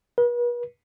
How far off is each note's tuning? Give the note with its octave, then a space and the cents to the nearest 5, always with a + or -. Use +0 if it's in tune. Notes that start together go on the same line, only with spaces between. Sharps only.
B4 -40